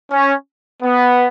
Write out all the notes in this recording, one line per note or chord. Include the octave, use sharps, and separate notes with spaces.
C#4
B3